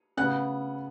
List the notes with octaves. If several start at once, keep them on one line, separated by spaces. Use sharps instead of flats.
C#3 B3 F#5 F#6